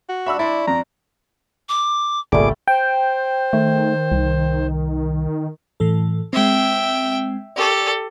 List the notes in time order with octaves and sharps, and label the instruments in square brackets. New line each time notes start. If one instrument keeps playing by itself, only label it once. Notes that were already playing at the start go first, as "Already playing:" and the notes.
[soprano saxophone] F#4
[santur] D4 C#6 [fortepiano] E5 B5 E6
[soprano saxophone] E4 [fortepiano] D5 E5 C6
[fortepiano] F2 [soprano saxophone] A#5
[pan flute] D6
[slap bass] G1 C2 [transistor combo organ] A#2 G#4 D6 [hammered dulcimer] G3 A3
[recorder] C5 [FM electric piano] G5
[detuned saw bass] D#3 [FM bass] A3
[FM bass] C2
[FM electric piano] A2 E3 A4
[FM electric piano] G#3 C4 [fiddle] E5 G5
[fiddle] G4 A4 [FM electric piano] D5 C#6